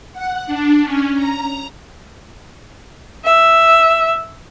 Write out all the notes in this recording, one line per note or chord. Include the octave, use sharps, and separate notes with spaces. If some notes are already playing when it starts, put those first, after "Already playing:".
F#5
D4
C#4
A#5
E5